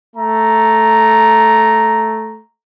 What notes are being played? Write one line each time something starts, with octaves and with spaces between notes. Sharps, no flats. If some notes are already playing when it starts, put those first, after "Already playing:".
A3 A#5